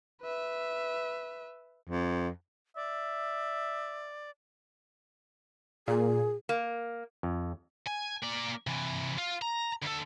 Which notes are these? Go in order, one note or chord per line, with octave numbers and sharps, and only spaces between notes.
B4 E5
F2
D5 E5
A#2 G#4
A#3
F2
G#5
A#3 D5
C3 E3
F4
A#5
D2 A4